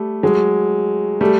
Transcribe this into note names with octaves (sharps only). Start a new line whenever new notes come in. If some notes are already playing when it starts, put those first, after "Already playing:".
Already playing: G3 A3
F#3 G#3
G3 A3